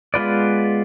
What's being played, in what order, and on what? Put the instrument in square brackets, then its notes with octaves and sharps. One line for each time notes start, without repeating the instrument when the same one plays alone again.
[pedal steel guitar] G#3 B3 F4 B4 D5